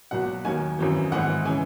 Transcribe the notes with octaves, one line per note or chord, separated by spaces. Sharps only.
B1 A#2 F#3 F#5
D#2 D#3 F#3 G#5
G#1 F#2 E3
G#1 G#2 E3 F#5
C#3 E3 G#5